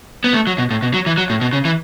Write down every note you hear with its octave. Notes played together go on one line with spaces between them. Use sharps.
B3
A3
F#3
B2
A2
B2
F#3
E3
F#3
A2
B2
C#3
E3